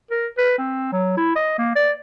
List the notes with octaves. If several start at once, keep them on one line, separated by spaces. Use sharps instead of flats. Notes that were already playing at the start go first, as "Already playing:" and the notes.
A#4
B4
C4
F#3
E4
D#5
A#3
D5